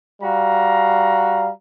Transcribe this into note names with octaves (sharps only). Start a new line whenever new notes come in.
G3 F#4 F5 A#5